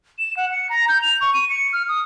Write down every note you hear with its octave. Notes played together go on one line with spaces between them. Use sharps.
E7
F#5
C#7
A#5
G6
F7
C#6
D#7
C#7
F6
D#6